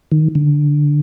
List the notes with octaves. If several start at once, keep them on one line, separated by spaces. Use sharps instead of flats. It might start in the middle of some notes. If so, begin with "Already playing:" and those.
D#3
D3